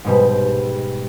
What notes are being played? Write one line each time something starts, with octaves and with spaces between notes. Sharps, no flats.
G#2 B2 G3